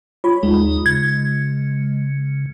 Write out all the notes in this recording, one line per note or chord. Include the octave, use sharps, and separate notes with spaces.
F4 C#5 B5
D#2 G#3 D#4
C#3 G#6